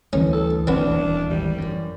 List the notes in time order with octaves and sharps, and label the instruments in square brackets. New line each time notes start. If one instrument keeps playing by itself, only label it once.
[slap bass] D2 D3 G3 [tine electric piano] E3 [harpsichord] C#4
[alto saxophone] A4
[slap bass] E1 D2 [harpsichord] B3 C4 [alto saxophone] D4
[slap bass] D#1
[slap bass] G#1 [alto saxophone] G3
[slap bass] F#2